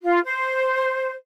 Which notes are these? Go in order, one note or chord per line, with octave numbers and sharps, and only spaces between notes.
F4
C5